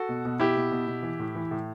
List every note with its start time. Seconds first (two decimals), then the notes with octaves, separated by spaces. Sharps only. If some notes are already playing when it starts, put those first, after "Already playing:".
Already playing: F#4 A4
0.09 B2
0.25 B2
0.40 B2 E4 G4
0.57 B2
0.72 B2
0.87 B2
1.03 E3
1.19 A2
1.35 E3
1.51 A2